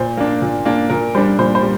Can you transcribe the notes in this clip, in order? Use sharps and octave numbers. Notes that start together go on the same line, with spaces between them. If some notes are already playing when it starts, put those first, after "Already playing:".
Already playing: A#2 C5
A#3 D4
A#2
A#3 D4
A#2 A#4
G3 D4 C5
A#2 C5
C5
G3